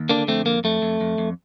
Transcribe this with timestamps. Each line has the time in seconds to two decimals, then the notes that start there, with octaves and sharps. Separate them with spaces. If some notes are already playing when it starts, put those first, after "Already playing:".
Already playing: D#2
0.09 D3 A#3 D4
0.28 F2 A3 C4
0.46 F2 A#3
0.64 F2 A3
0.82 F2
1.01 F2
1.18 F2